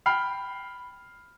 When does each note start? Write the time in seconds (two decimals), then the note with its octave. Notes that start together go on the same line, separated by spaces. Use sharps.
0.06 G5 B5 F6 C7